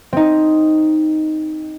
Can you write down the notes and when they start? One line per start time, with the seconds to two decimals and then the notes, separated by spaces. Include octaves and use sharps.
0.13 C4 D#4